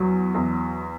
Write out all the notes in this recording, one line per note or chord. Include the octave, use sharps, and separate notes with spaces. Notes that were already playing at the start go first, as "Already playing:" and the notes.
Already playing: E2 F#3
E2